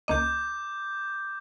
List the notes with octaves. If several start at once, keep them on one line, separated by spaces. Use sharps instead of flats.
C#2 A#3 D#5 D6 G6